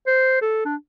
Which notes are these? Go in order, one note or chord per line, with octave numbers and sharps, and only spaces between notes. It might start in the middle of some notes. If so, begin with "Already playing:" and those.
C5
A4
D4